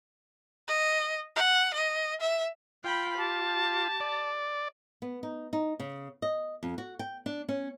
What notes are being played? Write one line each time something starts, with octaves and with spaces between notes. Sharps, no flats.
D#5
F#5
D#5
E5
F4 G5 B5
G4 A5
D5
B3
D#4
D#4
C#3
D#5
F2
F#4
G5
D4
C#4